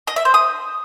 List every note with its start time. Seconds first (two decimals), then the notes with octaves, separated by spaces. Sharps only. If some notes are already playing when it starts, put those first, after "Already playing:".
0.07 D#5
0.16 E5
0.25 C5
0.34 D#6